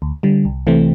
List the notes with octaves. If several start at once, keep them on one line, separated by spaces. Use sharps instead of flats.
D2
D3 G3
C2
C3 E3 A3 C4